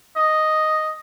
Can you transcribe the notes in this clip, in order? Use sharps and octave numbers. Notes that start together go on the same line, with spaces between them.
D#5